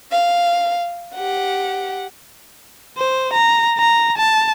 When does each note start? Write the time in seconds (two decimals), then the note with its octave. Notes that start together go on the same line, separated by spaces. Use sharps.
0.12 F5
1.15 G4 F#5
2.98 C5
3.33 A#5
3.78 A#5
4.17 A5